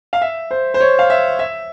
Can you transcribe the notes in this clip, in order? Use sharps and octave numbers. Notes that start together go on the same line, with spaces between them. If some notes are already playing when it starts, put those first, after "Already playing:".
F5
E5
C5
C5
C#5
F5
E5
E5